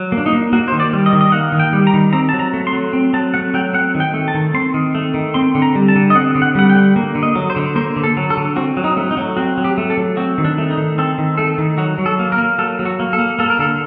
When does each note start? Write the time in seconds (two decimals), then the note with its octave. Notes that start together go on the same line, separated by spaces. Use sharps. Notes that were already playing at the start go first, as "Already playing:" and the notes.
Already playing: F#3
0.12 A#3
0.18 D4
0.26 D#4
0.33 A#3
0.53 A#3 F#4
0.68 D#3 C5
0.80 D5
0.93 G3
1.06 D#5
1.13 D#3
1.21 D#5
1.32 A#3 F#5
1.52 D#3
1.60 G5
1.73 G3
1.87 A#5
1.94 D#3
2.13 C4 A#5
2.29 F#3 A5
2.39 A#5
2.53 A3
2.67 C6
2.73 F#3
2.93 C4
3.13 F#3 A5
3.34 A3 F#5
3.54 F#3 G5
3.74 C4 F#5
3.95 D#3
4.00 G5
4.14 A3
4.28 A5
4.35 D#3
4.54 C4 C6
4.74 D#3
4.95 A3
5.14 D#3
5.34 C4 C6
5.55 D3
5.62 A#5
5.75 G3
5.88 A5
5.96 D3
6.10 D#5
6.15 C4 F#5
6.35 D3
6.42 F#5
6.55 G3 F#5
6.70 G5
6.76 D3
6.96 A#3
7.15 D3
7.23 D#5
7.35 F#3
7.50 C5
7.56 D3
7.76 A#3 C5
7.96 D3
8.04 A4
8.17 F#3
8.30 A4
8.37 D3
8.56 C4 F#4
8.77 F#3
8.84 D#4
8.97 A3
9.11 D#4
9.17 F#3
9.37 C4 F#4
9.58 F#3
9.64 G4
9.78 A3
9.90 A4
9.98 F#3
10.17 C4 F#4
10.38 D#3
10.45 D4
10.58 A3
10.71 D#4
10.77 D#3
10.98 C4 A4
11.18 D#3
11.38 A3 A4
11.58 D#3
11.78 F#3 F#4
11.98 F#3
12.06 A4
12.19 A#3
12.32 A#4
12.38 A#3
12.58 F#3 A4
12.79 F#3
12.85 F#4
13.00 A#3
13.13 A4
13.19 A#3
13.39 A#3 A4
13.50 A#4
13.59 D3 A4